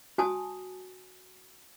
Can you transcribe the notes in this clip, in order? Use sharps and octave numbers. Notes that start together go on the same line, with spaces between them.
F#4 G#5 A5 D#6